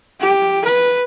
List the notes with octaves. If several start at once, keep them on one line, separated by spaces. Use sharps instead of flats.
G4
B4